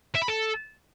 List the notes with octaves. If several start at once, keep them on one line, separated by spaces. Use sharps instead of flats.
E5
B5
A4